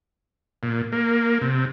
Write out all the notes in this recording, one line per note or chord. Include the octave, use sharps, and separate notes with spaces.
A#2
A#3
C3